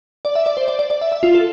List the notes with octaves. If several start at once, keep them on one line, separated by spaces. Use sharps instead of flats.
D5
E5
D5
C5
D5
D5
D5
E5
E5
F4
A4